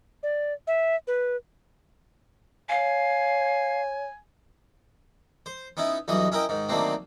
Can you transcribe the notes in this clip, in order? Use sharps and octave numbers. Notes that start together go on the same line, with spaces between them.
D5
E5
B4
C#5 F5 G#5
C5
B3 C#4 D#4 E4
B1 G2 E3 F#4 D#5
C#4 E4 A#4 D#5 G5
G#2 D#3
D3 D#3 F#3 A3 A#3 C4